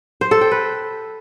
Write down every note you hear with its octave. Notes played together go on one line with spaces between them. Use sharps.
C5
A4
G5
B4